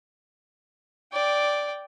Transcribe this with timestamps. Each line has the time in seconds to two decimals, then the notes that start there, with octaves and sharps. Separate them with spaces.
1.13 D5 G5